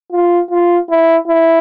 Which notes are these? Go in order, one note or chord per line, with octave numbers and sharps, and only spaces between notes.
F4
F4
E4
E4